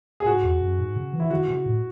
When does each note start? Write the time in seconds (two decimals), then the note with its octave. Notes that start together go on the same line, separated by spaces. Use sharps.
0.20 G#4
0.26 G#2 F#4
0.43 E2
0.61 F#2
0.79 G#2
0.96 C#3
1.13 E3
1.20 E4
1.30 D#3 F#4
1.48 C#3
1.66 A2